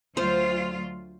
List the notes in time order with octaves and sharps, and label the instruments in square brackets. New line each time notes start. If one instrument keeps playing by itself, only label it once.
[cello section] D2 F#3 F4 [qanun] C5